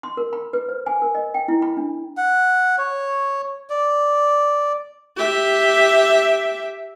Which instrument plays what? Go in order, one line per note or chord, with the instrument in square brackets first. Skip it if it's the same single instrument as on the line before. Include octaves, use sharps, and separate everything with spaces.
[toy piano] C6
A#4
B5
B4
C5
G#5
A#4
D#5
G5
E4
B5
D4
[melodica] F#5
C#5
D5
[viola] G4 E5